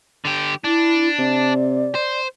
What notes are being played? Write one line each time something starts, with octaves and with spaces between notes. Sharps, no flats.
D3 G4
D4 E4
C3 D5
C5